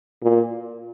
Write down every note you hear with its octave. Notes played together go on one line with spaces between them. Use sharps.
A#2